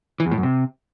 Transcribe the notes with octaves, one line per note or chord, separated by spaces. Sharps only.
E3
E2
A2
F#2
C3